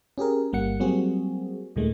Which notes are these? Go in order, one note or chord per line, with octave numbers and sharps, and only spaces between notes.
C#4 G4 G#4 A#4
G1 G3 A#3 F#5 C#7
F#3 G3 A#3 C4 F#4 G#4
D#2 A#2 D#3 G#3 A3